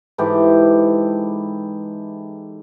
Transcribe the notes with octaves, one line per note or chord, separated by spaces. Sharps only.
G#2 E3 G4 A4